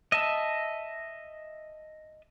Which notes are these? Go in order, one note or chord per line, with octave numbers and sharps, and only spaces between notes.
D#5 E5 A5